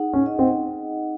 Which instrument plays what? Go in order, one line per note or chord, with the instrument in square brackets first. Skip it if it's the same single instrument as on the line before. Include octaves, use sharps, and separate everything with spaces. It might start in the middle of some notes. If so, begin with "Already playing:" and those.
Already playing: [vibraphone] D#4 G#4 F#5
[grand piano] C#4
[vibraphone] D#5
[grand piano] C4